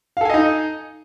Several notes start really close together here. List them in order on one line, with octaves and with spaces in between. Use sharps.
F5 A4 G#5 D#5 D#4